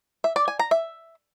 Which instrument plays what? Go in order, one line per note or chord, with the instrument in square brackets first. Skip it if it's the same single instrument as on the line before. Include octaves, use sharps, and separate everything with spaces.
[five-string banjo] E5
D5
G#5
A#5
E5